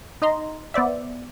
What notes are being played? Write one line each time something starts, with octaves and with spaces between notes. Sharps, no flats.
D#4 D#5 A#5 C6
B3 C5 D5 E5